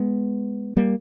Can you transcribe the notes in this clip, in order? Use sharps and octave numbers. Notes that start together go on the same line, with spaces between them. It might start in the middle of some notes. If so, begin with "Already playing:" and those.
Already playing: G#3 B3
G3 A#3